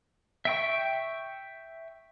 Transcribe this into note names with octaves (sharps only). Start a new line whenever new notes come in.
E5 G5 C#6